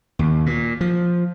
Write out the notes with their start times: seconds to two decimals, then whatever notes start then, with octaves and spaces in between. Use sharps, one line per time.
0.19 D#2
0.46 A#2
0.81 F3